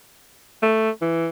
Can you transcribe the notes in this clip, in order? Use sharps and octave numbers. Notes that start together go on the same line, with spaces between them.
A3
E3